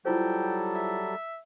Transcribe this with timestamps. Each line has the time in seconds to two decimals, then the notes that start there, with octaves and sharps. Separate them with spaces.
0.05 F#3 G3 E4 F4 A4 C5 G5
0.74 E5